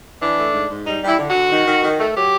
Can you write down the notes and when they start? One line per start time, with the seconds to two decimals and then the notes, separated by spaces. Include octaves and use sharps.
0.21 E3 D4
0.37 A3
0.53 G#2
0.69 G#2
0.85 G3 D#4
1.02 G3
1.07 E4
1.18 D3
1.29 F#4
1.34 D3
1.50 D#3
1.67 D#3
1.83 D#3
1.99 A3
2.15 F#3 G4